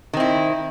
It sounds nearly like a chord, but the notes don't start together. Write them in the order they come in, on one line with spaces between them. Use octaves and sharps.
D#3 C4 E4